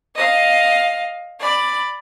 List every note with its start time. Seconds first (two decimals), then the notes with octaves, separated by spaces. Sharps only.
0.17 D#5 F5
1.40 D5 B5